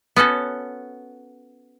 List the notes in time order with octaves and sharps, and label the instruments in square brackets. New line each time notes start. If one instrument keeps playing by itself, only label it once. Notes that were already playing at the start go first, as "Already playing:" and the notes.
[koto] B3 C#4 F#4 A4